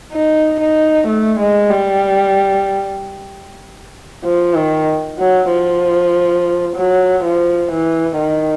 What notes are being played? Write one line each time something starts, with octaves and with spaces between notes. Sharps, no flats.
D#4
D#4
A3
G#3
G3
F3
D#3
F#3
F3
F#3
F3
E3
D#3